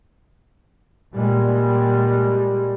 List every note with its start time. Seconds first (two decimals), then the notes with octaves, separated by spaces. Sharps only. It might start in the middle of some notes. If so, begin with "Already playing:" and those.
1.14 A#2 G3 G#3